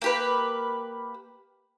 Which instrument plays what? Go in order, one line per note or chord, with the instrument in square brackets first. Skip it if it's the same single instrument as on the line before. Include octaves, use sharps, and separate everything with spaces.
[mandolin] A#3 G4 B4